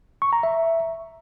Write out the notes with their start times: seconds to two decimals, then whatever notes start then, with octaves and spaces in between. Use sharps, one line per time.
0.22 C#6
0.33 A#5
0.43 E5